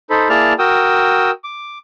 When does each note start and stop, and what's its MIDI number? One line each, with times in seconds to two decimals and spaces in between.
0.10 0.28 63
0.10 0.28 69
0.10 0.28 72
0.10 0.28 83
0.29 0.53 58
0.29 0.53 64
0.29 0.53 68
0.29 0.53 74
0.29 0.53 81
0.29 0.53 89
0.59 1.31 66
0.59 1.31 70
0.59 1.31 79
0.59 1.31 87
0.59 1.31 88
1.44 1.78 86